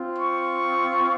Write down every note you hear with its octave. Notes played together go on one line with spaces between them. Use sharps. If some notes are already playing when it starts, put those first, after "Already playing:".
Already playing: C4 F4
C#6